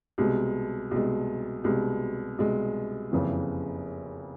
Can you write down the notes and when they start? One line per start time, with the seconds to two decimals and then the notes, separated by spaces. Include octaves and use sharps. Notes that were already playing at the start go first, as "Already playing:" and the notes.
0.18 C2 B2 G#3
0.91 C2 B2 G#3
1.64 C2 B2 G#3
2.38 C2 B2 G#3
3.11 F#1 F2 C#3 E3